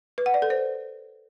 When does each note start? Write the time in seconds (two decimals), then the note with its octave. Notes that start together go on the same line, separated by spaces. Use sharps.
0.18 B4
0.26 F#5
0.34 D5
0.42 A4
0.50 C5